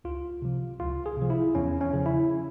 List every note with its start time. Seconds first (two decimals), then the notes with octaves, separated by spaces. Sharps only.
0.04 C#2 F4
0.42 C3 F3
0.80 C#2 F4
1.06 G#4
1.17 C3 F3
1.30 E4
1.55 E2 C#4
1.81 C#4
1.93 C#3 F3
2.06 E4